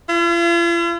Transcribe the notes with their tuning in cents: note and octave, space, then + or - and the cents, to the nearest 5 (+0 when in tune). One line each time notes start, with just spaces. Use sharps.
F4 -45